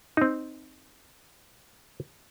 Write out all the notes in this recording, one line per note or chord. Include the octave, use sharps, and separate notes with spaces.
C4 D#4